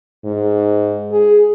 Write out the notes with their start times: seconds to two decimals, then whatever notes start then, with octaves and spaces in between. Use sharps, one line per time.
0.25 G#2
1.12 G#4